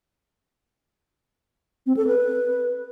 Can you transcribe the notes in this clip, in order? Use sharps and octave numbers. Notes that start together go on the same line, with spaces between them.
C4
A4
B4